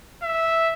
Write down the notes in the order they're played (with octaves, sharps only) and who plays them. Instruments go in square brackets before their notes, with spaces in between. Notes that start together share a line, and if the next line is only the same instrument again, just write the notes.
[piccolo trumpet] E5